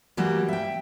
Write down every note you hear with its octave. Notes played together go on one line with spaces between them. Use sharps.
E3 F#3 G3 A#3
E5 G5